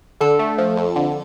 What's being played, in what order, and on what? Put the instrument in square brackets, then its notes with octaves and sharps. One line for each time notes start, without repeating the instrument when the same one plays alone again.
[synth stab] D3 [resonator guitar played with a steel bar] A4
[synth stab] A3
F3
F2
D3